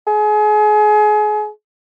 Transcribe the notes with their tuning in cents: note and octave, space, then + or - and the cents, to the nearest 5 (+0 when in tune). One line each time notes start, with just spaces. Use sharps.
G#4 +30